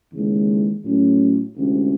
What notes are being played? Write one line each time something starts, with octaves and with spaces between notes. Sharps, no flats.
D#2 C#3 E3 G#3
A2 F#3 A3 C#4
D2 C3 E3 G#3 C#4